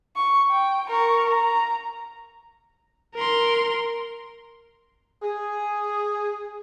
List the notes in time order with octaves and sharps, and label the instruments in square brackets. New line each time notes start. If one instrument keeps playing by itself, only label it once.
[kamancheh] C#6
G5
A#4 C#6
A#5
[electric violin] A#4 C6
[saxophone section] G#4